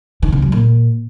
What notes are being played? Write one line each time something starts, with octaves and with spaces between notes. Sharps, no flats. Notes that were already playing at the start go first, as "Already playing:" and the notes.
D#3
C3
F#3
A#2